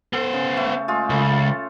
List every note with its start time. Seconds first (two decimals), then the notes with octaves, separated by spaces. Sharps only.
0.13 B3 A4 C5
0.33 C#3
0.57 A3
0.88 G#3 A3 F4
1.10 C#2 A4